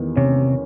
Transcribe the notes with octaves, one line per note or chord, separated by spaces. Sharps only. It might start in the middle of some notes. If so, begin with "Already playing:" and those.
Already playing: E2 D#3
C3 C#4